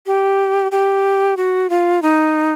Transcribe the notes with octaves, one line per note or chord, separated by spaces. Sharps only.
G4
G4
F#4
F4
D#4